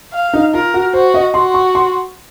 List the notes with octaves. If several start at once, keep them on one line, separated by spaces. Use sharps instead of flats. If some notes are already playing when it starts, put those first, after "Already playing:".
F5
D#4
F4 A#4
F#4
F#4 C5
D#5
F#4 C6
C#6
C6